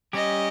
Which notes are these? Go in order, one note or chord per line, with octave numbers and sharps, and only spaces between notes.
G3 C#4 G4 D#5